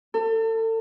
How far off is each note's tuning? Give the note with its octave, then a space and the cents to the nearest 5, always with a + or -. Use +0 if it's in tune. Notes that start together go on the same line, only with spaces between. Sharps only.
A4 +35